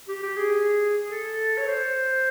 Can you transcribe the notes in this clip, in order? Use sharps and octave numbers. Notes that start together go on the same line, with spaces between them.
G4
G4
G#4
A4
C#5
C5